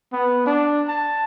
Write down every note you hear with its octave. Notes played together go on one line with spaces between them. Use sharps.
B3
D4
A5